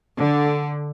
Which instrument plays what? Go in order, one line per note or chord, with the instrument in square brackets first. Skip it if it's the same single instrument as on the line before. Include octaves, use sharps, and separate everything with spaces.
[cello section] D3